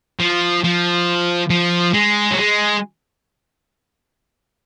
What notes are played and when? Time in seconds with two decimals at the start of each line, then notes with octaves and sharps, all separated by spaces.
0.20 F3
0.64 F3
1.50 F3
1.94 G#3
2.31 F#3
2.37 G#3